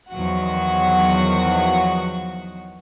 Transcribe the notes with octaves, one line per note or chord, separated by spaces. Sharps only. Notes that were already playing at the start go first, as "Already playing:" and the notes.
E2 D#3 F3 F#3 F#4 F#5